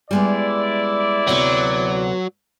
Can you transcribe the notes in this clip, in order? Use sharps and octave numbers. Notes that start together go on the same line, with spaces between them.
G3 G#3 B3 E4 D5
D2 C3 F#3 B3